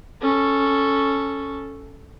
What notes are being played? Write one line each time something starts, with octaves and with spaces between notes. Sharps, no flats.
C#4 A4